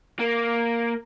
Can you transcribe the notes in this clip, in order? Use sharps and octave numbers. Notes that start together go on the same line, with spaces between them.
A#3